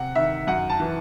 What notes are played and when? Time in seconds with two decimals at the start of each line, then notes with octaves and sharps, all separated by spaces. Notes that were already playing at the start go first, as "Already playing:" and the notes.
Already playing: C3 F#5
0.15 D#3 E5
0.47 F#2 F#5
0.70 A5
0.80 E3